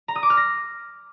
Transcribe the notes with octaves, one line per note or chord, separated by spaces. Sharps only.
A#5
D#6
D6
F6
A#6